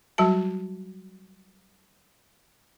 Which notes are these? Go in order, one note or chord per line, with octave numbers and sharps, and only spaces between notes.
F#3 G3 F#4 A5